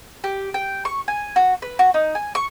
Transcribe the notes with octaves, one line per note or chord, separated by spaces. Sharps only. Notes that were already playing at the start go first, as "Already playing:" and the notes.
G4
G5
C#6
G#5
F#4
B4
F#4
D#4
G#5
C#6